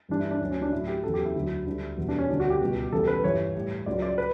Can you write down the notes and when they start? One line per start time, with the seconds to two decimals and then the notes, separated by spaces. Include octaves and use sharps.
0.09 G2 E3 G3 D4
0.20 E4
0.31 D4
0.41 D2 D3 F#3 C#4
0.51 C#4
0.62 D4
0.72 A2 F#3 E4
0.87 G4
1.03 E2 C#3 F#3 A4
1.14 G4
1.25 E4
1.35 D2 D3 F#3
1.66 D2 D3 G3
1.97 E2 B2 G3
2.08 D4
2.18 C#4
2.29 D2 C#3 G3 D4
2.40 F#4
2.50 G4
2.61 C#2 B2 G3
2.92 E2 C#3 E3 G3 A4
3.07 B4
3.24 G2 E3 G3 C#5
3.55 A2 G3
3.86 C#2 C#3 F#3 D5
4.02 D5
4.18 B4